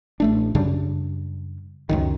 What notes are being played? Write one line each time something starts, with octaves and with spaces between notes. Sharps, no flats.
A1 A3 D4
F#2 C#3 G3 D4
C#2 F#2 D#3